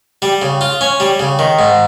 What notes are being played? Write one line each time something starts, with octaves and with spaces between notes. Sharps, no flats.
G3
C#3
F4
C#4
G3
C#3
D#3
G#2